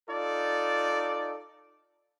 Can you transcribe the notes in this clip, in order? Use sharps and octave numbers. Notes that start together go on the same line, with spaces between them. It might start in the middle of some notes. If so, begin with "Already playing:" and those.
D#4 F4 A4 D5